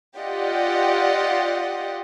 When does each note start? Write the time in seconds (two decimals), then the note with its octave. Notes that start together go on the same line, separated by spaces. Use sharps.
0.18 F4 G4 D5 D#5 F#5